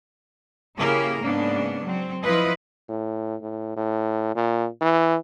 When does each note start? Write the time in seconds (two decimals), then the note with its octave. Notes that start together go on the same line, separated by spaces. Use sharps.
0.78 C#3 A#3 E4 G4 G#4 A#4
1.20 G#2 C#3 A#3 B3 D4
1.84 F#3 C4
2.24 F3 E4 F4 B4 D#5
2.89 A2
3.41 A2
3.77 A2
4.36 A#2
4.82 E3